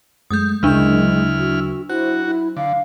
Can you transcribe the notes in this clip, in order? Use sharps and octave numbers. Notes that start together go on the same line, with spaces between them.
F#2 G#3 A3 D#6 G6
D2 C#3 F#3 G#3 D4 E4 A#4 F6
F#4
E4 F#4 C5
E4
D3 F5